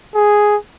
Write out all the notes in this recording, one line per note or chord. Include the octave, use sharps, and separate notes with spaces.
G#4